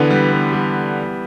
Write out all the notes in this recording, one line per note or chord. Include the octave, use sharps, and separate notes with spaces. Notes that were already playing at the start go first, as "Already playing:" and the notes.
Already playing: D3 E3 B3
G3
B3
G3